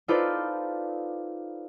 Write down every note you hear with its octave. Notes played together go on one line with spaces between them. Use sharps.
D#4 F4 A4 B4 C5 D5